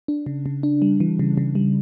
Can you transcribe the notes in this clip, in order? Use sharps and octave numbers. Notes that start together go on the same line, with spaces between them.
D4
C#3
C#3
D4
G3
E3
C#3
C#3
G3